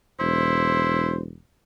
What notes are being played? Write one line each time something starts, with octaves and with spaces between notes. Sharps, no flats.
E1 E4 C5